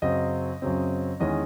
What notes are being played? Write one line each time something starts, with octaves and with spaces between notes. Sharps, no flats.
F#2 C#3 F#3 C4 D#5
F#2 C#3 F#3 C4
E2 D#3 G#3 C#4 D#5